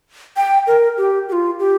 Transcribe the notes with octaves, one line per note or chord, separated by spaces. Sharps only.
G5
A#4
G4
G4
F4
G4